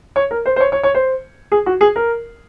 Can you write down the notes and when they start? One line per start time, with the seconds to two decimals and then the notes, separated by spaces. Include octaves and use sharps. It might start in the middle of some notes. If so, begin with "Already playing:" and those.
0.16 C#5
0.31 A#4
0.46 C5
0.56 C5
0.60 C#5
0.72 C#5
0.83 C#5
0.95 C5
1.52 G#4
1.66 F#4
1.81 G#4
1.96 A#4